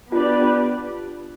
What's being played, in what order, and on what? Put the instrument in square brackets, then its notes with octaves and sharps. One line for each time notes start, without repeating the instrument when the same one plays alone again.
[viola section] B3 D4 G4 B4 D5 [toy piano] F4